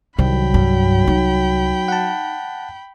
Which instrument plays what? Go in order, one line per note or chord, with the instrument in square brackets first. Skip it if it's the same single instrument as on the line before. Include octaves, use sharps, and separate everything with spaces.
[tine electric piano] C2 [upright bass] D#3 [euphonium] F#3 [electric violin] G5 B5
[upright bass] G2
D#4
[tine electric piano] F#5 A5